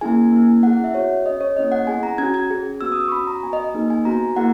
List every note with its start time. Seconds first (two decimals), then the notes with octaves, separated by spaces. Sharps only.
0.01 A#3 C#4 E4 G#4 G#5
0.32 A#3 C#4 E4
0.63 C#4 E4 G#4 F#5
0.73 F#5
0.84 E5
0.94 B3 F#4 C#5
1.25 C#4 G#4 D#5
1.41 C#5
1.57 A#3 C#4 E4 G#4 D#5
1.72 F#5
1.87 B3 E4 G#4 G#5
2.03 A#5
2.18 C#4 F#4 G#6
2.34 G#6
2.51 C#4 G#4
2.81 B3 F#4 E6
2.92 D#6
3.08 C#6
3.12 C#4 F#4 B5
3.27 A#5
3.43 B3 F#4 G#5
3.53 D#5
3.64 D#5
3.74 A#3 D#4 G#4
3.90 G#5
4.05 B3 F#4 A#5
4.36 A#3 E4 G#4 F#5